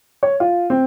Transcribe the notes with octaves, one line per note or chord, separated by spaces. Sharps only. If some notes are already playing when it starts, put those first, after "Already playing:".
C#5
F4
C4